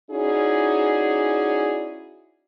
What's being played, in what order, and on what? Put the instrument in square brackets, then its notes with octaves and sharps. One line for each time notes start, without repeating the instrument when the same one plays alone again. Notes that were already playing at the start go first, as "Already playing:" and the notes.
[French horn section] C#4 D#4 E4 F#4 G#4 D5